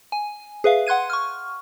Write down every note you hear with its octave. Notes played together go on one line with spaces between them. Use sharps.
G#5
G#4 B4 E5 F5
F#5 C6 F#6 G#6 D#7
C#6 F6